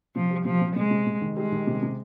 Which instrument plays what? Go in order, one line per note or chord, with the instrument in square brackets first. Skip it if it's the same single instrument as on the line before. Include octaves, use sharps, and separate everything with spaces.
[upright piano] C3 [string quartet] F3
[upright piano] G3
[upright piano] C3 [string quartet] F3
[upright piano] C3
[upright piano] C3 [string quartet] G#3
[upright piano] C3
C3
D#3
[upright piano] G3 [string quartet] G#3
[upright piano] D#3
C3
C3